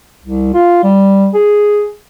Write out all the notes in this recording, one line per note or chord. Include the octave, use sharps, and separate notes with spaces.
C2
F4
G3
G#4